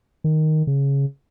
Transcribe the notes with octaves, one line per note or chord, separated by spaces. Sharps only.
D#3
C#3